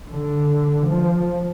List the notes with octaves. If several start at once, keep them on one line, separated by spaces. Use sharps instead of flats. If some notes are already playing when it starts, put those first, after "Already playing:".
D3
F3